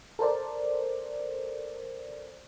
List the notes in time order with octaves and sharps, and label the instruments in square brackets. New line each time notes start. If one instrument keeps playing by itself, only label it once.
[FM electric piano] A4 A#4 C5 D5